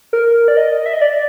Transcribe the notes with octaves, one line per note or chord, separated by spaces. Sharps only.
A#4
D5
D#5
E5
D#5
D5